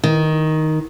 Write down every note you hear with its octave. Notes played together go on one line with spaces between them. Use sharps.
D#3